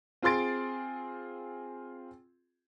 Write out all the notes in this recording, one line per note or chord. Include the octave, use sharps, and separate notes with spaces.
C4 F4 G#4 C6 A6 D7